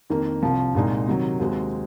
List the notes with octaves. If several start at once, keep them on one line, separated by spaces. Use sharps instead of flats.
F2 D#3 A#3
C2 C3 F3
C2 A#2 G#3 D#4
C3 D#3 F#3
D#2 D#3 G#3 C4 F#4